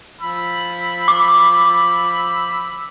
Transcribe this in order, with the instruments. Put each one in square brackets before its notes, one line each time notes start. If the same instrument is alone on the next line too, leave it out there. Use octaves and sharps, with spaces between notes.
[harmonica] F3 B5 E6
[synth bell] D6